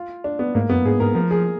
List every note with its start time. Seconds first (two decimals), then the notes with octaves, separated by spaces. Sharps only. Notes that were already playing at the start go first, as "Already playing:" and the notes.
Already playing: F4
0.24 D4
0.39 B3
0.55 G#2 A#3
0.69 F#2 B3
0.85 G#2 G#4
1.00 G#2 A#4
1.15 F3 A#4
1.31 G#4